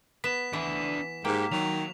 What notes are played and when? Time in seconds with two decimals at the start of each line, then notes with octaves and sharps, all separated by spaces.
0.24 B3 B6 E7
0.53 E3 D4 E5
1.25 G#2 A#3 G4 G5
1.52 D#3 F#3 F7